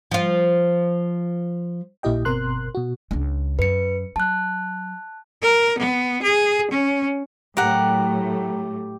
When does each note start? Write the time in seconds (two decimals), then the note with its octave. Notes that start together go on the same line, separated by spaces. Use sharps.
0.11 F3 F4
2.03 A#1 A#2 E4 G4 D#5 G5
2.25 G1 B2 C4 A#4 C6 F#6
2.75 B2 F#4
3.11 C#2 D4
3.59 F#2 B4 C#7
4.16 F#3 A5 F#6
5.42 A#4
5.79 B3
6.22 G#4
6.71 C#4
7.57 A2 F#3 A3 G4 A#4 F#5